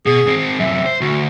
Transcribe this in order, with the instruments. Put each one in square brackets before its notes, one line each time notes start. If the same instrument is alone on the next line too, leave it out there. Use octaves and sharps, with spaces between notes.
[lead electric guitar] B2 [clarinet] G#4
[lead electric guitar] G#2 C4
[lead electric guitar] F#2 C3 [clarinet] E5
[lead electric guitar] C5
[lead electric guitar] D2 [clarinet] F#4